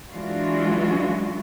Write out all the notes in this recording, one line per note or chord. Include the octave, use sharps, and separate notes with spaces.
E3 F#3 G#3 D4 F4 F#4